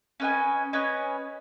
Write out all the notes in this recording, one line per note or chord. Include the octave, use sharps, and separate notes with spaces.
C#4 B4 D#5 G#5
C#4 B4 D#5 G#5